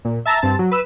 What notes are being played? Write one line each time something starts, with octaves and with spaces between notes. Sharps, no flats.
A#2
E5 A5 A#5 E6
G2 C4 A5
F#3
B4 E6